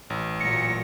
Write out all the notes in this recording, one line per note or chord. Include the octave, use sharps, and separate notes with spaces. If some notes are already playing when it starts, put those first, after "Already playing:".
A1
A#2 F#3 A#6 C#7